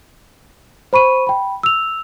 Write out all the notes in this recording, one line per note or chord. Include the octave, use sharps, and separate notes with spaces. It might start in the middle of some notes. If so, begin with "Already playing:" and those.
C5 B5 C#6 D#7
G5 B5
E6 F7